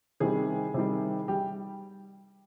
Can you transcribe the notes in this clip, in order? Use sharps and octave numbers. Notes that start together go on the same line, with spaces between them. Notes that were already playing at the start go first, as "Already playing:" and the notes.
C3 D#3 G3 G#4
C3 D#3 G3
G3 G4